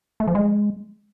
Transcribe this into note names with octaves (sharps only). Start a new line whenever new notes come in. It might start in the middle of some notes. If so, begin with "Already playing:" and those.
A3
F3
G#3